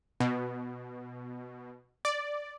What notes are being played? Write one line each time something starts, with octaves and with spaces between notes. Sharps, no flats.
B2
D5